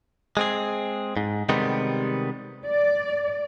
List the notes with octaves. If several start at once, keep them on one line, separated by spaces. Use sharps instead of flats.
G#3 C4 G#4
G#2
C3 D#3 G3 G#3 B3
D5